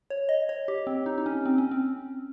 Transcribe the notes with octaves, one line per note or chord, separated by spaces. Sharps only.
C#5
D#5
C#5
G4
C4
D#4
D#4
C#4
C4
C#4
C4